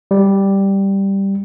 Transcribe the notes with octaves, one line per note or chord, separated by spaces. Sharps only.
G3